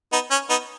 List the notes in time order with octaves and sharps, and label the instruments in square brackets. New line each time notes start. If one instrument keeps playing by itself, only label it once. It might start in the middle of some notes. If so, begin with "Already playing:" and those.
[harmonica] B3 D#4
C#4
B3 D#4